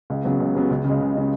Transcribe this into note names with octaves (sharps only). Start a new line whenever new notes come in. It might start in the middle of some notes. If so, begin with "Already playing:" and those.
C#2
C#3 F#3 B3
C#2
C#3 F#3 B3
C#2
C#3 G#3
C#2
C#3 G#3